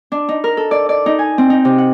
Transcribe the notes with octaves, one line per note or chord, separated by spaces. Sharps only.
D4
D#4
A#4
A4
D5
D5
D#4
G#5
C4
D#4
C3
F#5